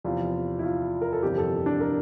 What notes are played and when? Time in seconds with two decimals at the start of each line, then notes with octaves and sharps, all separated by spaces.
0.04 E2 C3 F3 F4
0.59 E4
0.63 F4
1.02 A#4
1.13 A4
1.22 G1 F2 C3 E3 G4
1.38 A4
1.66 D4
1.80 A#4